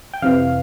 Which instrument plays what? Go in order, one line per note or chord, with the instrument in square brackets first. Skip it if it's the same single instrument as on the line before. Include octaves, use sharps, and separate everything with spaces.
[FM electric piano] G5
F2 C3 E3 F5